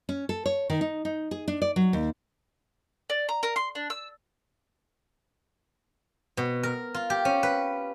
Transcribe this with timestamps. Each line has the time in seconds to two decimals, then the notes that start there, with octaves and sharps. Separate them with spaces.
0.09 C#4
0.29 A4
0.46 C#5
0.70 D#3
0.81 D#4
1.05 D#4
1.31 G#4
1.48 D4
1.62 D5
1.76 F#3
1.93 D#2
3.10 D5
3.29 A#5
3.43 A#4
3.56 C6
3.75 D4
3.90 E6
6.37 B2
6.63 A#4
6.94 F4
7.10 G4
7.25 C#4
7.43 B4